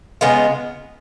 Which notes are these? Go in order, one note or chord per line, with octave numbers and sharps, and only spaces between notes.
C#3 G#3 B3 F4